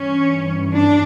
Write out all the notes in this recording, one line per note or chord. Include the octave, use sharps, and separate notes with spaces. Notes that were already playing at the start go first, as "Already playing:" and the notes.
Already playing: G2 E3 C#4
D4